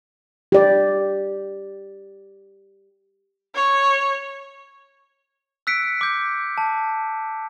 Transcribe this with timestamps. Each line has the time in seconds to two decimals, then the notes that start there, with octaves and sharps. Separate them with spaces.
0.52 G4 D5
3.55 C#5
5.67 E6 F#6 B6 C#7 D7
6.01 D6 G6
6.58 A5